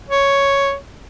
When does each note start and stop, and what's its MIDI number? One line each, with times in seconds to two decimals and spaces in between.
0.09 0.75 73